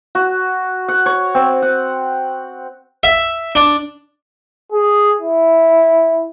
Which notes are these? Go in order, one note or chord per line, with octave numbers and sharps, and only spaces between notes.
F#4
F#5
C#5
C4
F#5
E5
D4
G#4
E4